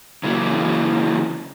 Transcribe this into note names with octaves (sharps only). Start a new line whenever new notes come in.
C#3 E3 F#3 A#3